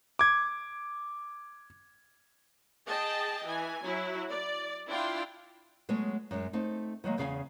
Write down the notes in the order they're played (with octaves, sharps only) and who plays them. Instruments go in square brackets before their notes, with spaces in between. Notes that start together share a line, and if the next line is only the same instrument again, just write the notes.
[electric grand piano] D6 G#6
[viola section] G#4 D#5 G5 A5
E3 G#5
F#3 E4
D5
D4 E4 F4 G5 C6
[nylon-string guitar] F#3 G#3 A3 B3 G#4 C#5
F#2 G#3
A3 C4 D#4
D#3 F#3 G#3 A#3
E2 C#3 G#4 F5 G5 G#5